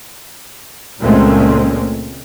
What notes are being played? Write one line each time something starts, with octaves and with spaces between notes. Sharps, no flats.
C#2 A#2 G#3 A3 C4 C#4